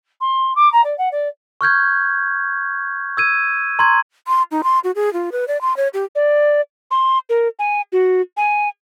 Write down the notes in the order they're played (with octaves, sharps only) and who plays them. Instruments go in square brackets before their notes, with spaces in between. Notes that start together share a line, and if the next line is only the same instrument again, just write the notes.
[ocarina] C6
D6
A#5
D5
F#5
D5
[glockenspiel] C#6 F6 G6 G#6
E6 G#6 D#7
A#5 C6 C#6 G#6
[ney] C6
D#4
C6
F#4
G#4
F4
B4
D5
C6
C#5
G4
[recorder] D5
C6
A#4
G#5
F#4
G#5